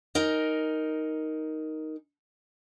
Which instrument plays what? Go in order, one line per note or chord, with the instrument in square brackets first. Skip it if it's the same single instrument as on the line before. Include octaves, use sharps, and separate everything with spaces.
[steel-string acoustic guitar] D#4 A#4 G#5